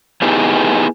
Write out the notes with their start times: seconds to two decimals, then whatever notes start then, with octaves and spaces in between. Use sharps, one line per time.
0.22 B3 D#4 E4 G4 G#4